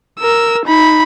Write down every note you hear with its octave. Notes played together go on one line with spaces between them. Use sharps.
A#4 E6
D#4 B5